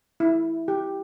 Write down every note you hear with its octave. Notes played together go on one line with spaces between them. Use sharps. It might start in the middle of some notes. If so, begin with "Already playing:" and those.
E4
G4